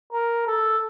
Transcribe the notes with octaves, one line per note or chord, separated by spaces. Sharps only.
A#4
A4